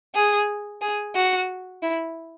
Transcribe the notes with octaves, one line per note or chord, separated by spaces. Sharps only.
G#4
G#4
F#4
E4